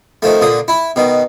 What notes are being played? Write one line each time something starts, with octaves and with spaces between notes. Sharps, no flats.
D#3 F3 A3
A#2 D3 D#6
E4
B2 D#3